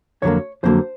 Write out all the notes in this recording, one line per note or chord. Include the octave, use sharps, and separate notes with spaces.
F2 D3 F#3 A#3 C#5
F2 D3 F#3 A#3 C5